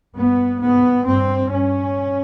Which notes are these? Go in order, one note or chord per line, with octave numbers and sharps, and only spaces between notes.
G2 B3
G#2 B3
G2 C4
G2 C#4